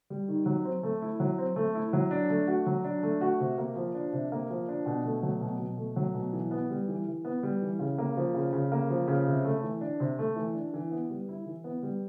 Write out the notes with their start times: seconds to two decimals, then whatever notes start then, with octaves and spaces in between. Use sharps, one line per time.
0.10 G3
0.28 D#3
0.46 F#3
0.65 C4
0.83 A3
1.02 E4
1.20 F#3
1.38 C4
1.56 A3
1.75 E4
1.93 F#3
2.11 D4
2.29 A3
2.47 F#4
2.66 F#3
2.84 D4
3.03 A3
3.21 F#4
3.40 C3
3.58 A#3
3.76 F3
3.94 D4
4.13 C3
4.32 A#3
4.50 F3
4.68 D4
4.86 B2
5.05 A3
5.23 F#3
5.41 B2
5.60 B2
5.77 A3
5.96 F#3
6.15 B2
6.33 E3
6.51 B3
6.70 G3
6.88 E3
7.07 E3
7.25 B3
7.43 G3
7.62 E3
7.79 C#3
7.98 A#3
8.17 F3
8.34 C#3
8.53 C#3
8.72 A#3
8.90 F3
9.08 C#3
9.27 C3
9.45 A3
9.63 E3
9.81 D4
10.00 C3
10.19 A3
10.36 E3
10.55 D4
10.74 E3
10.91 B3
11.10 G3
11.29 E4
11.46 E3
11.64 B3
11.83 G3